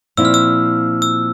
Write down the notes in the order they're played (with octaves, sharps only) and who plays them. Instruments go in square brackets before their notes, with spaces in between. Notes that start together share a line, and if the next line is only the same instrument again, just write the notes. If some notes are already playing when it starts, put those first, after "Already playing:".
[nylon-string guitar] A#2 F3 C4 E4 [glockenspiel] E6
[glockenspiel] F6
E6
E6